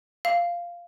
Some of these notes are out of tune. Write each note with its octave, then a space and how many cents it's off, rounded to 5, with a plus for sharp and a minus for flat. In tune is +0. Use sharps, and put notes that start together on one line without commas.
F5 -10